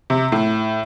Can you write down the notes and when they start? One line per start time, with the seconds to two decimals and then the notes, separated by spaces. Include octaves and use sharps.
0.10 C3
0.32 A2